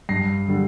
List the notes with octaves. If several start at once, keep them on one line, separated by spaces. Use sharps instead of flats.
G2 A#6 C7
D3 G3